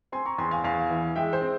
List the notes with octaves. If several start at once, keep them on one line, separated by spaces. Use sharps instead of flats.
C4 G#5 C6
A#5 C#6
E2 G#5 C6
F5 G#5
E2 F5 G#5
E3
G#3 E5 G5
C5
C4